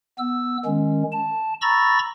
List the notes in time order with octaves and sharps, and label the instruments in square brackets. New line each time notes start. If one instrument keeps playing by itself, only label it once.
[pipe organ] B3 E6
D#3 G#3 C#4
A5
A#5 B5 C#6 E6 A6 A#6